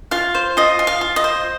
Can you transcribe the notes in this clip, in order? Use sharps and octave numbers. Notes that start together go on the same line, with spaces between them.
F4 F5
C5
F4 D#5
F4
F5
F4
D#5
C5